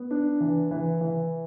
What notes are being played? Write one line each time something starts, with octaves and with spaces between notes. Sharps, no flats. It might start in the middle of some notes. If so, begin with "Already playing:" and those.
Already playing: B3
D4
E3
E3
E3